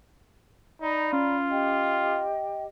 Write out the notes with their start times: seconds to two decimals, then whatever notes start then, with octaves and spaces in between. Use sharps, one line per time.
0.81 D#4 D5 A#5 B5
1.13 C#4 F4
1.51 G4 D#5 G5